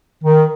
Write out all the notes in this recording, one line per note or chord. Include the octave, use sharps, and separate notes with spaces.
D#3